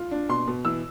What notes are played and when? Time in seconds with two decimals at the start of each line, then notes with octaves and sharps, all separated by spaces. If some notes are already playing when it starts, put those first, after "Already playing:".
Already playing: F4
0.11 D4
0.29 B2 C6
0.47 B2
0.65 E3 E6